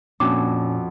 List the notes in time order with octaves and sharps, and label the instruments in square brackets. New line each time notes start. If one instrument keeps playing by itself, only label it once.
[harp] F2 F#4 E6 [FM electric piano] A#2 [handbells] C#4 D4 [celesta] D6